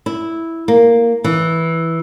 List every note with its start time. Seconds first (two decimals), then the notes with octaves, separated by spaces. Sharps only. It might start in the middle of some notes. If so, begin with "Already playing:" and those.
0.06 E4
0.68 A#3
1.24 E3